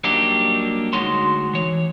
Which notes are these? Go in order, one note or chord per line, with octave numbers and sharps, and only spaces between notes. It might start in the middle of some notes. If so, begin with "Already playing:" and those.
F#3 G3 A#3 D4 D#4 G4
D2 G#3 D#4 F#4 C#5 C6
E3 C#5